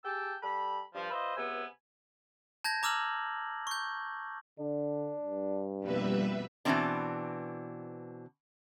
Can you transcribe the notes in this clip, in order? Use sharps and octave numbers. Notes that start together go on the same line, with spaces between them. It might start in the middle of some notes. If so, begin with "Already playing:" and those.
G4 G#4 G5 A5 E6
G3 A4 B5
G2 F3
F4 B4 C5 D#5 E5
C#2 C3 B3 G#5 E6
A5 G6 G#6 A#6
A#5 D6 E6 F6 F#7
C#6 G6
D3 D4
G2
F2 B2 G3 A#3 B4 E5
B2 E3 F#3 A#3 C4 D4